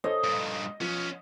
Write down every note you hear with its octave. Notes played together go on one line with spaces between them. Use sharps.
A4 C5 C#5 D#5
G2 A#2
F3 B3 C#4